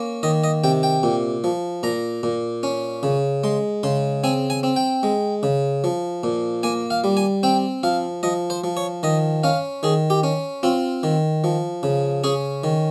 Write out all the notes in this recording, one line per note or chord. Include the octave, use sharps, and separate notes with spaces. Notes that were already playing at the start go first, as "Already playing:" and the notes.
Already playing: A#3 C#4
D#3 D#5
D#5
C3 G5
G5
A#2
F3
A#2 A#5
A#2
C#4
C#3
G#3 C6
C#3 C6
C4 G#5
G#5
C4
G5
G#3
C#3
F3
A#2
A#3 G#5
F5
G3
G#5
C4 G5
F3 F5
F3 D#5
C5
F3
C#5
D#3 D#5
C#4 F5
D#3 G#4
G4
C#4
C4 F4
D#3
F3
C#3
C#4 G#4
D#3